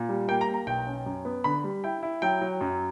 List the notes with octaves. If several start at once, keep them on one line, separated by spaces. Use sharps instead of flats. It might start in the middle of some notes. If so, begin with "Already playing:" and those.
Already playing: A#2
G3
A#3 G5
A#5
A#3
A#5
B1 G5
C#4
F#2
B3
D3 B5
G3
E4 G5
E4
F#3 G5
F#3
F#2